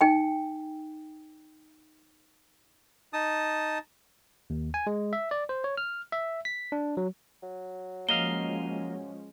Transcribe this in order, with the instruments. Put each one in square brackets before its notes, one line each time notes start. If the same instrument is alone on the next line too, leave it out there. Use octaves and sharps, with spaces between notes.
[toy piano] D#4 G5 G#5
[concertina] D#4 A5 D#6
[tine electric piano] D#2
G#5
G#3
E5
D5
C5
C#5
F6
E5
B6
D4
F#3
[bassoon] F#3
[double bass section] F3 G#3 C#4 [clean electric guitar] A#3 D#5 F5 [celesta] G7